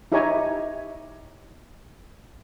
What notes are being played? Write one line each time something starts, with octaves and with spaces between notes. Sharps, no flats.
D#4 E4 G4 C#5 G#5 A#5